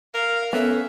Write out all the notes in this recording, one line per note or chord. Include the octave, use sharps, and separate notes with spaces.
A#4 F5
B3 C#4 A4 E5